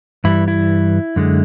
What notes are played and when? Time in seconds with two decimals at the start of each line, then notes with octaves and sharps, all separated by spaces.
0.24 G2 E3 G3 E4
0.48 E4
1.16 F#2 D3 G#3